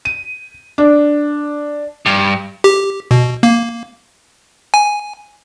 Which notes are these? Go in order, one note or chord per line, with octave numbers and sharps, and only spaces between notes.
D#7
D4
G2
G4
B2
A#3
G#5